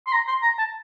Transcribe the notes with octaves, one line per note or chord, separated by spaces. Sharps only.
C6
A#5
C6
A#5
A5